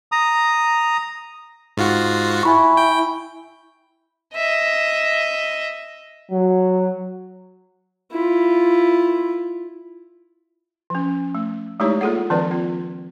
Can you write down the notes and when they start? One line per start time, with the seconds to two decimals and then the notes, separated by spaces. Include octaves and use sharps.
0.12 A#5 D#6
1.77 G#2 F4 F#4
2.43 E4 G#5 B5 C#6
2.77 G5
4.35 D#5 E5
6.31 F#3
8.12 E4 F4
10.90 F3 C#4
11.35 A3
11.80 G#3 A3 D#4 E4 G4 C#5
12.01 A#3 F4 G#4 A4 F#5
12.30 D#3 F3 C4 D4 B4 D5
12.51 C4 F4